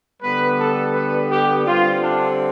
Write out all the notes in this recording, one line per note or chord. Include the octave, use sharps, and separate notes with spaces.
D3 G3 B3 B4
A4
B4
G4
D3 G3 C4 F4
D4